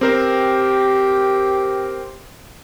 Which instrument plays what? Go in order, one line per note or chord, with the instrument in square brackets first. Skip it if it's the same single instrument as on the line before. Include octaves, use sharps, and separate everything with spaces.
[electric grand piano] C4 A#4 C5 [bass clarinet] G4